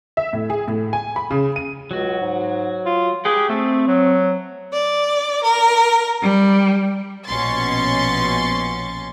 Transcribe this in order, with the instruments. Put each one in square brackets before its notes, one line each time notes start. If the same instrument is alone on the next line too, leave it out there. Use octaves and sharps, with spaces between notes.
[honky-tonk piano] E5
A2
G#4
A2
G#5
B5
C#3
D#7
[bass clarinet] C#2 [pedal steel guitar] F#3 F#4
[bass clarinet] G#2
F4
[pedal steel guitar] G4 B4 G5 [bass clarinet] G#4
[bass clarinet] A3 [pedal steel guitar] C4
[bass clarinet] F#3
[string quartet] D5
A#4
G3
[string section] A#1 B2 C#4 C6 C#6 A6